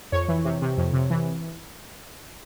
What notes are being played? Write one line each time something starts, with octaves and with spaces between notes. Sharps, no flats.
F2 C#5
E3
C3
C3
F2
C3
E3